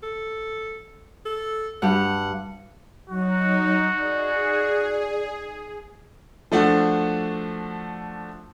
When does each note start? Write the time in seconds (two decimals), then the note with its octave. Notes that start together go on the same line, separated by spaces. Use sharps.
0.03 A4
1.25 A4
1.82 G2 G4 F#5
3.10 F#3 D#4 F#4
3.99 G#4 D5
6.52 F3 A3 D4 F#4